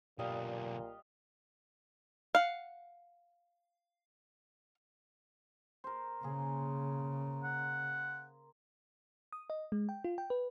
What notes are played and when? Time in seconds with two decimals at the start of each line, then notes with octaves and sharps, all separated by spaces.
0.19 B1 A#2 D3 G3 D#5 F5
2.35 F5 F#5
5.84 A#4 C5
6.23 C#3 A#3 G#4
7.44 F#5
9.33 D#6
9.50 D#5
9.72 G#3
9.89 G5
10.04 F4
10.18 G5
10.30 B4